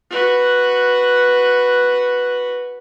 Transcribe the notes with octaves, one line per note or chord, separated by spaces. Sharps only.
F#4 B4